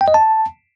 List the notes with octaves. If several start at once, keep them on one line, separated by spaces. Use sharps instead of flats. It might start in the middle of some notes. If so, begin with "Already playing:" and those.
G5
D#5
A5